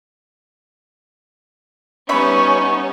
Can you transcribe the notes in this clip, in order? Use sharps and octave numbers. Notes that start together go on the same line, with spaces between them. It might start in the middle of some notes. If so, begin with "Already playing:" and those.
G3 B3 C#4 D#4 C#5 E5 B5 C#6